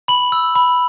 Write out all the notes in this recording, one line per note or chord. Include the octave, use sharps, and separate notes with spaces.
B5 F#7
E6
B5